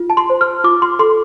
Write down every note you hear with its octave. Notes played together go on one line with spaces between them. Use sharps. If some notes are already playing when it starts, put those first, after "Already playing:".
Already playing: F4
A5
C6
C5
F6
F4 D6
C6
A4 C6